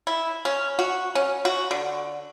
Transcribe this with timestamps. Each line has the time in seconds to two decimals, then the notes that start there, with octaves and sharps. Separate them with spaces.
0.07 E4
0.45 C#4
0.79 F#4
1.15 C#4
1.45 F#4
1.71 D3